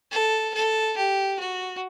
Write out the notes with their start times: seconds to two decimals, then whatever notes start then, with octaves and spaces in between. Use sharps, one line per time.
0.11 A4
0.54 A4
0.97 G4
1.39 F#4